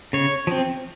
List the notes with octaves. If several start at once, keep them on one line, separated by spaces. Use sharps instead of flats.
C#3 C#5
F3 C4